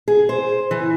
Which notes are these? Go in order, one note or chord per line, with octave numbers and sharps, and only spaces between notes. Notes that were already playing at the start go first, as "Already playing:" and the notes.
G#4
C5
E3